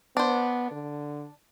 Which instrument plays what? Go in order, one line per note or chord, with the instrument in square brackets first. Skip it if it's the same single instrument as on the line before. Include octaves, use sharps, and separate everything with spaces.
[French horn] B3 [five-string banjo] D4 C5
[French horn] D3